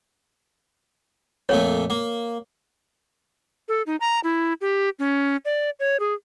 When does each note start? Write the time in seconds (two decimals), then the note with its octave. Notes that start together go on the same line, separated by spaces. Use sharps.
1.49 F2 A#2 A3 C#5
1.90 A#3
3.68 A4
3.87 D#4
4.00 A#5
4.24 E4
4.61 G4
4.99 C#4
5.45 D5
5.80 C#5
6.00 G#4